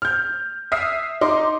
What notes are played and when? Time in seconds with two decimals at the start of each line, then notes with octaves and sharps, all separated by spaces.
0.02 F6 G6
0.72 E5 D#6 F6 C7
1.21 D#4 C6 D6